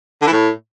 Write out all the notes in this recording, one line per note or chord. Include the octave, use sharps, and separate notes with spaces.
D3
E3
A2